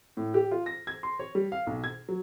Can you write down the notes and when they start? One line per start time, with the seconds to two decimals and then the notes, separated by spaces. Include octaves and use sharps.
0.17 A2
0.34 G4
0.51 F4
0.66 A#6
0.87 G#6
1.03 C6
1.19 C#5
1.35 G3
1.52 F5
1.67 B1
1.84 G#6
2.08 F#3